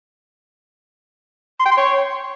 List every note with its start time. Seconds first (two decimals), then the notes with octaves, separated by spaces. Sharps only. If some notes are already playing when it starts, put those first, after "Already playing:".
1.60 C6
1.66 G5
1.72 C6
1.77 C#5